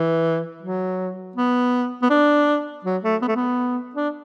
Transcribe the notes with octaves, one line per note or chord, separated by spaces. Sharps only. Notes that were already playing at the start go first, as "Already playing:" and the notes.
Already playing: E3
F#3
B3
B3
D4
F#3
A3
B3
A3
B3
D4